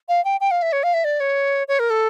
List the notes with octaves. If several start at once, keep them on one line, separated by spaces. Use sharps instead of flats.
F5
G5
G5
F5
E5
C#5
F5
E5
D5
C#5
C#5
A#4
A4